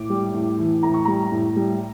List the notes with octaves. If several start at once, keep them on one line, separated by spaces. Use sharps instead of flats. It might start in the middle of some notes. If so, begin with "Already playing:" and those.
Already playing: A2 D6
G3
A2
E3
A2 A#5
C#6
G3 A#5
A2
G3